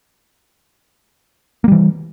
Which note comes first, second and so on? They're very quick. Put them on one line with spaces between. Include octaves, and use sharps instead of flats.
A#3 G3 E3